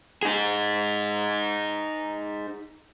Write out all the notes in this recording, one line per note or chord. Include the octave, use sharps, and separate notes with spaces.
D#4 G#4